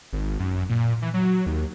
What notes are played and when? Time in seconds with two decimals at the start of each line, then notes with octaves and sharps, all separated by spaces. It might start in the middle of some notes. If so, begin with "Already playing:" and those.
0.13 G#1
0.39 F#2
0.69 A#2
1.02 E3
1.14 F#3
1.46 D#2